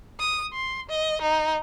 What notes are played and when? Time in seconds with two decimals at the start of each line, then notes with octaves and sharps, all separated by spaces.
0.20 D#6
0.53 C6
0.89 D#5
1.21 D#4